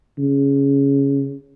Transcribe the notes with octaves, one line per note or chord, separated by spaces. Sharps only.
C#3